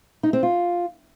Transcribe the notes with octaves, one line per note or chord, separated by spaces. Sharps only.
D#4
C4
F4